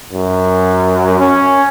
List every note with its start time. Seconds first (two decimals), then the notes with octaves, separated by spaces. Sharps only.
0.13 F#2
1.19 C#4